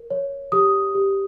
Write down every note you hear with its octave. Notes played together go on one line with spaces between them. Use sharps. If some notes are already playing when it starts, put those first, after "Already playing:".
Already playing: A#4
C#5
G4 D#6
G4